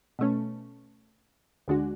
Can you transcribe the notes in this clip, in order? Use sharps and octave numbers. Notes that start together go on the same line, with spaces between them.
B2 A3 C#4
D2 D3 G#3 D4 F#4